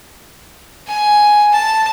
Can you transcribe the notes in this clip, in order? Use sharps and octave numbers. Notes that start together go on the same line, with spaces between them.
G#5
A5